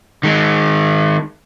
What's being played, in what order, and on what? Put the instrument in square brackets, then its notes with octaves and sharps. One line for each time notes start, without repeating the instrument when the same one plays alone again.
[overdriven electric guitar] D#3 G#3